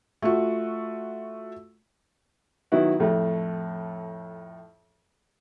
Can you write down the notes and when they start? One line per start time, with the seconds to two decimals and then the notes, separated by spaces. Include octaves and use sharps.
0.22 A3 F4 F#4
2.72 D#3 F#3 B3 E4 F#4
3.00 F2 A2 A3